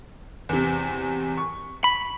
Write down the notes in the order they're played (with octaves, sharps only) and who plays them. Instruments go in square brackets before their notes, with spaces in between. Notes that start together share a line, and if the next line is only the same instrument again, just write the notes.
[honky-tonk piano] E2 C3
C#6
[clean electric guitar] B5